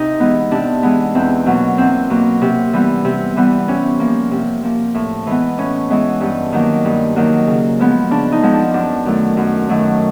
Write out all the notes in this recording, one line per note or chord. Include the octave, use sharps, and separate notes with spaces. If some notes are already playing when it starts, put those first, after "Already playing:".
Already playing: C3 D#4
E3 G#3 B3
C3 D4
E3 G#3 B3
E2 C4
B2 F#3 A#3
E2 C4
B2 F#3 A#3
C3
E3 G3 B3
C3
E3 G3 B3
C3 C#4
F3 A#3
C3
F3 A#3
A2
E3 G#3 B3
A2 C#4
E3 G#3 B3
G2
D#3 F#3 A#3
G2
D#3 F#3 A#3
C#3
F3 G#3 B3
C#3 D4
D#4
F3 G#3 B3
D4
F#2 D4
D#3 F#3 A3
F#2
D#3 F#3 A3